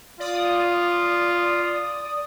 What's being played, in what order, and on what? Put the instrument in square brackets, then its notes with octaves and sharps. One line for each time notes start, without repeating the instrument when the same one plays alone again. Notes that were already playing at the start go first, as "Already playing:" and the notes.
[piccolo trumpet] F4 [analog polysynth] D5 D#6